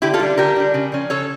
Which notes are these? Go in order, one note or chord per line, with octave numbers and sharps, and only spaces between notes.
D3 E4 G4
F4 A4
G3 D4
D3 G4 A#4
G3 D4
C#3
F3 C#4
C#3 A4 C#5